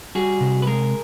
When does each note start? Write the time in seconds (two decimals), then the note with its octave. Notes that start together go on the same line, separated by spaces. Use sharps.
0.15 G3 F#4 G#4
0.41 C3
0.62 B4
0.67 G#3 G#4 A#4